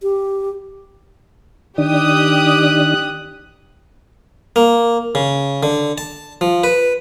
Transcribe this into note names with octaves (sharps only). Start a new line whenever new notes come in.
G4
D#3 D4 G4 D#6 F#6
A#3
C#3
D3
A5
F3
B4